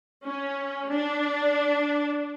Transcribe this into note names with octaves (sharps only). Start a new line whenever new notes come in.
C#4
D4